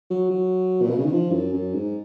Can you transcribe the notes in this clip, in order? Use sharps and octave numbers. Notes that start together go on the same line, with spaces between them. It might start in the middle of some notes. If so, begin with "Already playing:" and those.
F#3
F#3
A#2
B2
C#3
D#3
F3
F#2
F#2
G#2